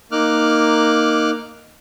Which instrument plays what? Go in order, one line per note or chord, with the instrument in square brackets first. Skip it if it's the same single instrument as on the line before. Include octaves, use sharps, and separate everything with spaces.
[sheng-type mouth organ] A#3 D#4 D6 F6 F#6